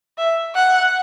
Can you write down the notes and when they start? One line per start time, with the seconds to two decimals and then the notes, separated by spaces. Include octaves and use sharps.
0.18 E5
0.55 F#5